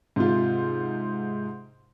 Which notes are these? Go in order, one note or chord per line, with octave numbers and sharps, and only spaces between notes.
G#2 C3 F4